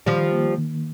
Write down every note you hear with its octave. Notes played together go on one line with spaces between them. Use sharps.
D#3 F3 G3
A#3
D#3